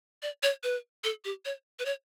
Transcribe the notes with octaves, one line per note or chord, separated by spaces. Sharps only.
D5
C#5
B4
A4
G4
C#5
B4
C#5